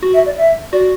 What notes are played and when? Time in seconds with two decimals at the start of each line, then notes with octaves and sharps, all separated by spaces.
0.03 F#4
0.14 E5
0.26 D5
0.38 E5
0.72 F#4 D5